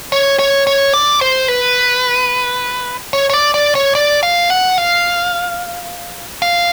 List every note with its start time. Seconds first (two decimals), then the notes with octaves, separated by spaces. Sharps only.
0.12 C#5
0.39 C#5
0.67 C#5
0.94 D5
1.21 C5
1.48 B4
3.13 C#5
3.30 C#5
3.34 D5
3.54 D5
3.75 C#5
3.95 D5
4.23 F5
4.50 F#5
4.78 F5
6.42 F5